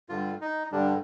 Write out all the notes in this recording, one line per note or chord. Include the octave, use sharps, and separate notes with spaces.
G2 D3 G3 F4
D#4
G2 D3 G3 D4